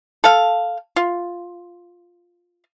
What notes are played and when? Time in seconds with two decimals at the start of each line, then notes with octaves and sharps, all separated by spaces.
0.24 A4 F5
0.96 F4